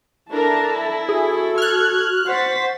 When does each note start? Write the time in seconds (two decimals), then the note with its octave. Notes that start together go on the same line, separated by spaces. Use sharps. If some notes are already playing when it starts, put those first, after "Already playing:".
0.31 D4 E4 A4 A#4 A5 A#5
0.68 E4
1.09 F#4 G#4 A4
1.58 F6 F#6 G#6
2.27 C5 F#5 C#6 A6 B6